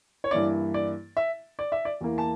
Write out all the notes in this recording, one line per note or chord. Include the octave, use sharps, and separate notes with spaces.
C#5
G2 E3 A#3 E4 D5
D5
E5
D5
E5
D5
E2 E3 A#3 E4
A5